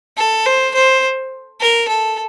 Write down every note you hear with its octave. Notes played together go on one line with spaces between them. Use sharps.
A4
C5
C5
A#4
A4